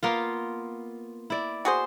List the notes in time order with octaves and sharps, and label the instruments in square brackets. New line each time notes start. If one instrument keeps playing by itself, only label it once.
[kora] A#3 B3 F4
E4 D5
[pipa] F#4 G#4 C5